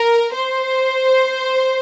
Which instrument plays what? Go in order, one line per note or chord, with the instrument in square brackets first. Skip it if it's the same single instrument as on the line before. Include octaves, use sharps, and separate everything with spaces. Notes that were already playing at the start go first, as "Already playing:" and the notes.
Already playing: [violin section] A#4
C5